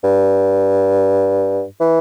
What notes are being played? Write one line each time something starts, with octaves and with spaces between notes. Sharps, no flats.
G2
E3